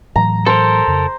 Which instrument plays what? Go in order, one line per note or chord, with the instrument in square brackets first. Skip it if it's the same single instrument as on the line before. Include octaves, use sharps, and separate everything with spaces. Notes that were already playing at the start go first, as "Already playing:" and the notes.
[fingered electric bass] A2 E3 F#3 [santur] A#5
[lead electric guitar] A4 A#4 [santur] C5
[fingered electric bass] F2 C#3